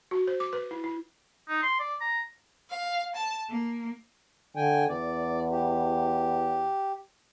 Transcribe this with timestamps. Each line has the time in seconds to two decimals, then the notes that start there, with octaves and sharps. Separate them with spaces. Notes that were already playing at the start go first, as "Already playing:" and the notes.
0.11 F#4
0.27 C5
0.40 D6
0.53 B4
0.71 E4
0.84 E4
1.49 D#4
1.63 C6
1.80 D5
2.01 A#5
2.70 F5
3.15 A5
3.50 A#3
4.56 D3 G5 G#5
4.89 E2 D5
5.51 G4